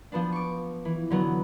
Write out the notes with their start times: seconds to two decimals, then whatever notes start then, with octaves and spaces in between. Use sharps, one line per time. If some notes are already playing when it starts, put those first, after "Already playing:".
0.12 F3 B3 D4
0.32 C#6 D6
0.85 E3
1.10 D3 F#3 B3